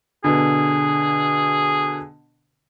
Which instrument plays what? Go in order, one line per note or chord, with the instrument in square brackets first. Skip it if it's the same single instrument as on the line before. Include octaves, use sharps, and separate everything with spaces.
[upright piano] B2 D3 [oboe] G#4